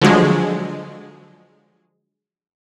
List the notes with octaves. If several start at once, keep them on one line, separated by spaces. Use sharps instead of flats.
D3 F3 F#3 G#3